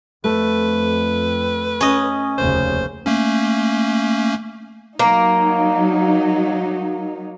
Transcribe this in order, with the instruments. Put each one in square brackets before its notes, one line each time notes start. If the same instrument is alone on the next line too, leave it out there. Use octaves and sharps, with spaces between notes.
[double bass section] F2 [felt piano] A3 [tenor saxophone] B4
[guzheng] C#4 D#5
[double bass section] F1 D#2 C#3 [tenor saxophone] C5
[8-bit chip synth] A3 A#3 C#4
[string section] F#3 D#4 [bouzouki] A#3